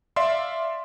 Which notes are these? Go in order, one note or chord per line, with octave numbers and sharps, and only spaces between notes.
D5 E5 F5 C6